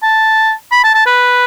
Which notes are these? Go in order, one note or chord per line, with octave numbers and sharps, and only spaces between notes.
A5
B5
A5
A5
B4